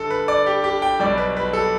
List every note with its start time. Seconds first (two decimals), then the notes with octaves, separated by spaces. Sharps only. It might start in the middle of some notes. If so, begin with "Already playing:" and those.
Already playing: G1 G2 A4
0.10 B4
0.28 D5
0.46 G4
0.64 G4
0.82 G5
1.00 B1 B2 G3 D5
1.18 B4
1.37 B4
1.53 A4